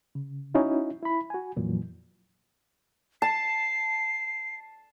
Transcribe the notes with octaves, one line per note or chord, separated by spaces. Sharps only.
C#3
C#4 D#4 E4 F#4
E4 B5
F#4 G#5
F2 A#2 E3 F#3
A5 C7